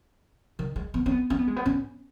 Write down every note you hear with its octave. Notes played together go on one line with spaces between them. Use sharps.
D#3
G#3
B3
C#4
B3
C#4
B3
G#3
B3
C#4